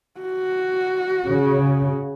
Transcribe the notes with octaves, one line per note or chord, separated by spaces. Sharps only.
F#4
C#3